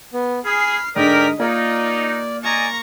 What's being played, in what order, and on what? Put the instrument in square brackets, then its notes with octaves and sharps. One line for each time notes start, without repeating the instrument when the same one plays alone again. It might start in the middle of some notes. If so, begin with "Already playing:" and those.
[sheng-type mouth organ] B3
[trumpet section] G#4 [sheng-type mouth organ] B5 [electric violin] F6 C7
[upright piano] G#2 D3 [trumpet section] A#4 [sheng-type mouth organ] D5 G5 [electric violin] D#6 B6
[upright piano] A#3 A#4 [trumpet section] D#4 [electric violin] F4 [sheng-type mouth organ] D5
[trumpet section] D5 D#5 G#5 [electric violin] A#5 C#6